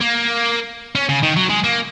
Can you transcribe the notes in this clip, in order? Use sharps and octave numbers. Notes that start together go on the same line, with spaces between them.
A#3
C#4
C#3
D#3
F#3
G#3
A#3